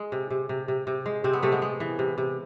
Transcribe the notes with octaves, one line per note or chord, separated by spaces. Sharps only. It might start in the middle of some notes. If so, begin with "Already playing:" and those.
Already playing: G#3
C3
C3
C3
C3
C3
G#3
C3 C4
B3
C3 A3
G#3 B3
G#3
E3
C3
C3